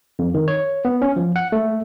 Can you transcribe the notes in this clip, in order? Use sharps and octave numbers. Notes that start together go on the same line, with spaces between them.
F2
D#3
C#5
B3
C#4
F3
F#5
A3